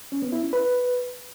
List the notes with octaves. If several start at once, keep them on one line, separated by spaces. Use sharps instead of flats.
C#4
B3
E4
C#4
B4